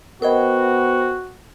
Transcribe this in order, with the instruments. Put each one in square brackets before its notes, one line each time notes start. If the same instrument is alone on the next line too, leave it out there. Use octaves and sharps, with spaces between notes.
[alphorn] B3 [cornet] F#4 [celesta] A#4 D#5 [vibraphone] C5 G5 B5